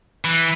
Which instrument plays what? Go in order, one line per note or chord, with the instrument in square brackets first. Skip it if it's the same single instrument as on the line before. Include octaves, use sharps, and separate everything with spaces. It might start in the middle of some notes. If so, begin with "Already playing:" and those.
[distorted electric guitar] E3